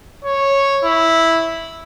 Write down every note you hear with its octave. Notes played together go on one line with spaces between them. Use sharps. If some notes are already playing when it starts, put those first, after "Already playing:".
C#5
E4